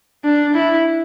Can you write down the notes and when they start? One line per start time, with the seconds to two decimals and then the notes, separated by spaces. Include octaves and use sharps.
0.24 D4
0.55 E4